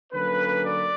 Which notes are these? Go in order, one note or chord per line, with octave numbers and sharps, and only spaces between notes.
D3 F#3 A#3 C#4 B4
D5